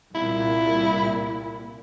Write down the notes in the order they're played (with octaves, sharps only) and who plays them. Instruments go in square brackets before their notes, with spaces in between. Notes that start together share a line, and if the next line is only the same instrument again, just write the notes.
[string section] C2 A#2 [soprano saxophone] E4